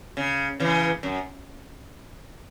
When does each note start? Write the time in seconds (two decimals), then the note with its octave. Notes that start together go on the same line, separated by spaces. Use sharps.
0.17 C#3
0.60 C#3 E3
1.03 F#2